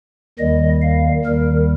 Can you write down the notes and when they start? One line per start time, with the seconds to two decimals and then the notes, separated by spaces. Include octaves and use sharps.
0.39 D#2 D#3 G3 D#5
0.82 F5
1.25 D#2 D#3 G3 A#4